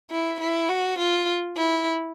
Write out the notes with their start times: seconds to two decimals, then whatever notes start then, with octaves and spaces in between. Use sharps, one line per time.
0.11 E4
0.40 E4
0.70 F#4
0.99 F4
1.57 E4